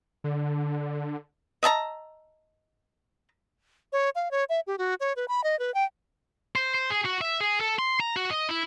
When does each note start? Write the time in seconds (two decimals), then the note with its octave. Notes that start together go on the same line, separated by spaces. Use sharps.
0.24 D3
1.63 D#5 E5 A5 A#5
3.93 C#5
4.15 F5
4.31 C#5
4.49 E5
4.67 G4
4.78 F#4
5.00 C#5
5.16 B4
5.28 B5
5.44 D#5
5.59 B4
5.74 G5
6.56 C5
6.75 C5
6.90 G#4
7.05 F#4
7.21 E5
7.41 G#4
7.61 A4
7.79 C6
8.00 A#5
8.17 F#4
8.31 D#5
8.49 E4